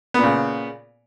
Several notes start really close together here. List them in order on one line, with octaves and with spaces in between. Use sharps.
B3 A#2 C#3